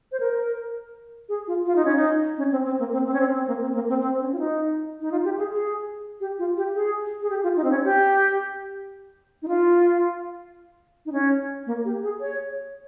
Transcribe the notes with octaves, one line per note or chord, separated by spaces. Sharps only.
C5
A#4
G#4
F4
F4
D#4
C#4
D#4
C#4
C4
C4
A#3
C4
C4
C#4
C4
C4
A#3
C4
A#3
C4
C4
C#4
F4
D#4
D#4
F4
G4
G#4
G#4
G4
F4
G4
G#4
G#4
G4
F4
D#4
C4
C#4
G4
D#4
F4
D#4
C#4
A#3
G4
G#4
C#5